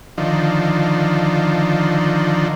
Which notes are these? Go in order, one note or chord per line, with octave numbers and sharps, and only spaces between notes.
D3 D#3 F3